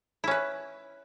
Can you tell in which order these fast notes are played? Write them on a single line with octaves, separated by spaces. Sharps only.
E4 C#4 B4